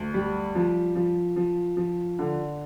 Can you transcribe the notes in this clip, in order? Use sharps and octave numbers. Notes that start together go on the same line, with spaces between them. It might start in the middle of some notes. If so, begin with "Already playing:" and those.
Already playing: D2
G3
F3
F3
F3
F3
D3